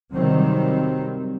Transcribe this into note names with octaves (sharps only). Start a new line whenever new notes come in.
C3 D#3 F#3 G3 C4